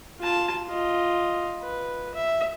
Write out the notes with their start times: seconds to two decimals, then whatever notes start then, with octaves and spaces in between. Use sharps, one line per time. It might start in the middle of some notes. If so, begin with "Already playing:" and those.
0.20 F4 A5
0.68 F4 D#5
1.62 B4
2.15 E5